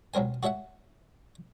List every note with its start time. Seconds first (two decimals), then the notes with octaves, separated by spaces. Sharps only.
0.14 B1 F#3 C4 A#4 G#5
0.43 F#4 A4 C#5 E5 F#5